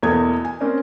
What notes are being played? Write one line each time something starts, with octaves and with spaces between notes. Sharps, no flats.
E2 B2 A#3 A4 D#6 G#6
G#5
A#3 C4 C#4 A#4 C5 D5